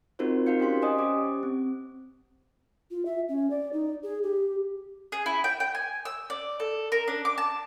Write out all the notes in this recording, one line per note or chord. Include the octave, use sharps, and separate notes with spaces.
C4 D#4 F4 F#4 A#4 C5
D#4 F#4 A#4 F5 G6 C#7
C#4 G4 C6 B6
C5 D5 D#5 G#5 D#6
C#4 G4 D6
C4
F4
E5
C#4
D5
D#4
G#4
G4
G#4
E4
G5
G5
G#5
E6
D5
A4
A#4
D4
D6
A5